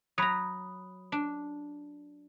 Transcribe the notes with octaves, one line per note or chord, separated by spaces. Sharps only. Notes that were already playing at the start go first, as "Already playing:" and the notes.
F#3 A#5 B5 D#6
D4